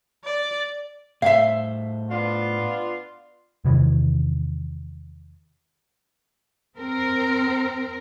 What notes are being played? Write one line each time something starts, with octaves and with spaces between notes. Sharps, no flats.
D5
A2 C5 E5 F5
B3 D4 F4
E2 C3 D#3 E3
C4 A#4